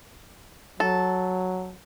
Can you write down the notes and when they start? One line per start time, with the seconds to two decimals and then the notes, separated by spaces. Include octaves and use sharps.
0.80 F#3 A4